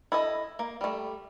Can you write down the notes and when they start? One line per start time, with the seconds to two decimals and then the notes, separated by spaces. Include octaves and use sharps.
0.12 E4 A4 D#5
0.59 A#3
0.81 G3 A3